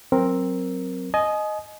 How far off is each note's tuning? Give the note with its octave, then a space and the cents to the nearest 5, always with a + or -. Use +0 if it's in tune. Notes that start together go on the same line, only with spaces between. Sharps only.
F#3 +0 C4 +10 A#4 +0
D#5 -5 G#5 +35